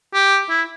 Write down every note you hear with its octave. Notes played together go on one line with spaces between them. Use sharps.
G4
E4